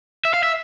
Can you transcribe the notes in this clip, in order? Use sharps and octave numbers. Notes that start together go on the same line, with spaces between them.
E5
F5
E5